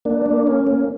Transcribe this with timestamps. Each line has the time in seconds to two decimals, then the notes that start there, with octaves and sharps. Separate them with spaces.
0.05 A#3 D4
0.26 A#3
0.47 C#4
0.67 A#3